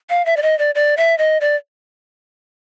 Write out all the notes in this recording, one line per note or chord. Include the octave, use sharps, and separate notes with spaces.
F5
E5
D5
D#5
D5
D5
E5
D#5
D5